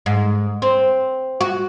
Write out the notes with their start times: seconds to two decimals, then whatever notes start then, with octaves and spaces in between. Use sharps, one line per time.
0.06 G#2
0.62 C4
1.41 F#4